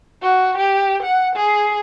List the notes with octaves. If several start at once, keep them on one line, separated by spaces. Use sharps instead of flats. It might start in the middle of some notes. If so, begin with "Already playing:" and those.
F#4
G4
F#5
G#4